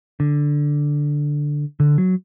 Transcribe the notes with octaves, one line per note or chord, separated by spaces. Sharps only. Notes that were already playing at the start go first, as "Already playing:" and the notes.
D3
D3
F#3